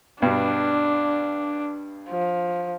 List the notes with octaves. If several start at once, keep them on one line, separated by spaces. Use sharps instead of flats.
G2 B2 D4
F3